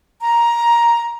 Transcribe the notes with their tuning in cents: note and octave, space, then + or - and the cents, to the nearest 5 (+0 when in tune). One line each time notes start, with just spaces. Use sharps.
A#5 +10